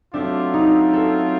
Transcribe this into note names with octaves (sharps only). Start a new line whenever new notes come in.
F#3 A3 C4 D4 F4
D#4
A4